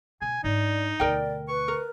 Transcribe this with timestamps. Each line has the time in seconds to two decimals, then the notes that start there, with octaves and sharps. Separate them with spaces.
0.22 B2 G#5
0.44 G#2 D4 D#4 D5
1.00 D2 B2 A#4 D5 G5
1.48 B4 C#6
1.68 A#4